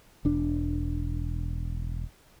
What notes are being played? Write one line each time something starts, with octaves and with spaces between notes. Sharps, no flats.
E1 D4